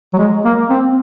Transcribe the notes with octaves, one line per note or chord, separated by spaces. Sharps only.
F#3
G#3
A#3
C4